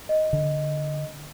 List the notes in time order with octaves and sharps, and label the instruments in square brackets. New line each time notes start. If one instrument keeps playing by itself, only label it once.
[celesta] D#5
[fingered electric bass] D3